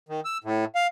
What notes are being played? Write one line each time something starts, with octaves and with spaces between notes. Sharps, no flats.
D#3
E6
A2
F5